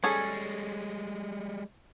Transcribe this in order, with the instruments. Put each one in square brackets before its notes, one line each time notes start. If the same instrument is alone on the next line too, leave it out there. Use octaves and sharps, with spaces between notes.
[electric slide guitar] G3 G#3 [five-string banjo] C#4 G#4 A4